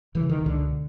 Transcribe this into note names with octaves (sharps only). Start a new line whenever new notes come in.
E1 D2 C#3 E3
D#3
C#2 B2 D3